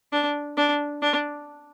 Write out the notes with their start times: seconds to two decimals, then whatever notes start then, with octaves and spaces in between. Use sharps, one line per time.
0.12 D4
0.57 D4
1.02 D4